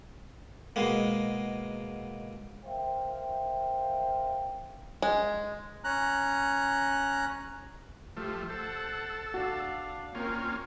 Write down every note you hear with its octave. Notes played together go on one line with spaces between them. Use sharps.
B2 G#3 A#3
A#4 C5 E5 F5 G5
G#3
C#4 A#5 F#6
F3 A3 G4
A4 C5 F#5
D4 F#4 F5
A#3 C4 C#4 F4 A#4